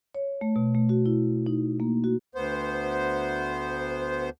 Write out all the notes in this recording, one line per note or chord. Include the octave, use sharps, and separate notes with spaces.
C#5
A3
B2
A3
F#4
E4
D#4
A#3
F#4
D2 B3 C5